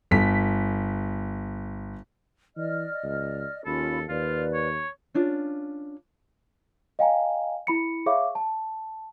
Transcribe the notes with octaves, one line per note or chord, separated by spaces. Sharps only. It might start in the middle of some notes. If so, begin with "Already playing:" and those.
G1 B6
E3 D5 D#5 F6
C#2
D#2 C#4 F4 A4 B5
D#2 F4 B4 D5
C#5
C#4 D4 F4
D#5 F5 G5 G#5 A#5
E4 B5 C#7
G#4 C#5 E5 F5 C#6 D6
A5